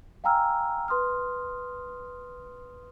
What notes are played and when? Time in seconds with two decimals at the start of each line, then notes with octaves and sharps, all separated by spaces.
0.24 F5 G5 G#5 A#5 E6 F6
0.88 B4 C6 D#6 F6